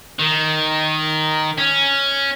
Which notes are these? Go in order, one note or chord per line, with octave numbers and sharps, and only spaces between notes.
D#3
C#4